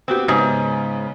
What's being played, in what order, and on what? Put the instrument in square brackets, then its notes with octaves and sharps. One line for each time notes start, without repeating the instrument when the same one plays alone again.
[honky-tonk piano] B3 F#4 G4 [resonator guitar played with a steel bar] C4
[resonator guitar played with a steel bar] G#2 [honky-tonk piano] C#3 B3 C#4